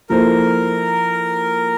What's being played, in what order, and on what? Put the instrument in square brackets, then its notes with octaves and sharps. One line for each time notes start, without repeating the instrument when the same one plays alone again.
[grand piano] F3 A#3 E4 A4 C5 [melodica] A#4